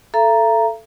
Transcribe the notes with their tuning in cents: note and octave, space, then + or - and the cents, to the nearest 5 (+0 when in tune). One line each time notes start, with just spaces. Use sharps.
A4 +0 E5 +45 A#5 +0